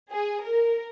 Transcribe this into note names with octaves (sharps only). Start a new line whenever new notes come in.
G#4
A#4